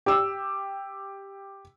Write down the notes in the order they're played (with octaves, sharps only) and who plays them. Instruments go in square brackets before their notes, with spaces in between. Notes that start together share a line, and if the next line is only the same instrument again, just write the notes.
[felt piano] G4 E6